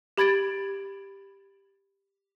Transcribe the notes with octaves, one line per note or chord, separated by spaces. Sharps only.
G4 B5 G#6 A6 D7